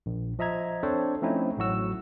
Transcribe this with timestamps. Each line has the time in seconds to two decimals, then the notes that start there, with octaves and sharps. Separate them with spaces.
0.06 A#1
0.39 F3 D#5 E5 A#5 G#6
0.83 C4 D4 A4 C5 C#5
1.22 F3 A3 C4 C#4 D#4 E4
1.57 A1 A2 F#3 F#4 E6